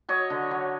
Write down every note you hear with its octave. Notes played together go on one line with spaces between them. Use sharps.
F#3 C#5 D#5
D3
F#3